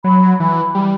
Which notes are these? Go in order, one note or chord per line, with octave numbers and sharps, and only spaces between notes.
F#3 B5
E3 B5
G3